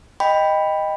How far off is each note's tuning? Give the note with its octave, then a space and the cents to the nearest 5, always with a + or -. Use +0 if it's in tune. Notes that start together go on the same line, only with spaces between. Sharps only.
D#5 +0 G5 +10 B5 +0